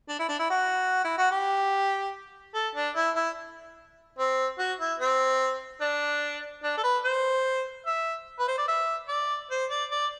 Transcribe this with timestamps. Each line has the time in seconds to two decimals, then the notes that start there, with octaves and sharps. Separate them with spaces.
0.09 D4
0.19 E4
0.29 D4
0.39 E4
0.50 F#4
1.04 E4
1.18 F#4
1.31 G4
2.55 A4
2.75 D4
2.96 E4
3.16 E4
4.19 C4
4.59 F#4
4.80 E4
4.99 C4
5.81 D4
6.64 D4
6.77 A4
6.84 B4
7.04 C5
7.86 E5
8.39 B4
8.48 C5
8.58 D5
8.68 E5
9.09 D5
9.51 C5
9.70 D5
9.91 D5